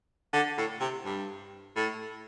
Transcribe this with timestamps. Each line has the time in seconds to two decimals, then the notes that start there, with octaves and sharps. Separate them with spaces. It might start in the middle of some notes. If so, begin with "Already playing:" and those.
0.33 D3
0.58 A2
0.80 C3
1.05 G2
1.76 A2